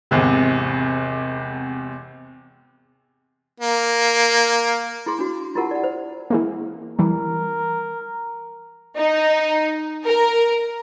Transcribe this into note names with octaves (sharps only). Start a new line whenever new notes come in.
G#1 E2 C3
A#3
E4 G#4 C6
D4 F#4
E4 F4 G4 A#4 F#5 A5
D5 F#5
C5
E3 G#3 A#3
E3 G3 A#4
D#4
A#4